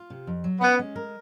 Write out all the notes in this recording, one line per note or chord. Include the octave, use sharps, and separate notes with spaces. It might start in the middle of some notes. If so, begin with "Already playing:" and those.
Already playing: F4
C3
F2
F#3
B3 C#4
G#3
A#4